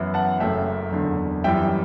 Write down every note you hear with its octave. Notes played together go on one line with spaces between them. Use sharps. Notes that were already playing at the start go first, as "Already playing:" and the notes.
Already playing: F#2 E3 B3 E4
F#5 A5
F#1 F#2 C#3 F#3 A3 E5 G5
F#1 E2 D3
F#2 E3 G3 E5 G5